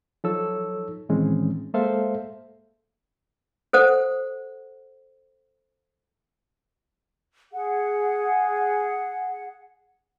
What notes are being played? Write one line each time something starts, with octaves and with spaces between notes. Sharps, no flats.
F3 F#3 D#4 A4 C#5 E6
A2 D#3 E3 G#3 C4 C#4
G#3 A#3 A4 C5 E5 F5
A4 C5 F#5
G#4 F#5